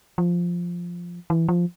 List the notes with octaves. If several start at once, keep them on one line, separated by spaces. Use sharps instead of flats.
F3
E3
F3